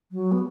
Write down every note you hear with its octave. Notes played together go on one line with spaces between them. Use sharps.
F#3
B3